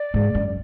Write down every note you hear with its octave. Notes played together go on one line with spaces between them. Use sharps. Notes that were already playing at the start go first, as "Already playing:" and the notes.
Already playing: D5
G#2
F#2